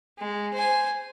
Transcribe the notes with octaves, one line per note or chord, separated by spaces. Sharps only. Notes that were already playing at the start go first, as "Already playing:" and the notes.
G#3
C5 G#5